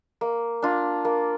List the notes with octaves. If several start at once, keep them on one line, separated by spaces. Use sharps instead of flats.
A#3
D4 F4
A#3